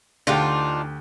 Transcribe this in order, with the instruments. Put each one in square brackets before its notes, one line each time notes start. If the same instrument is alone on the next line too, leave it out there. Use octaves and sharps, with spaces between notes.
[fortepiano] D2 G4 G5 [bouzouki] D4 D#4 F4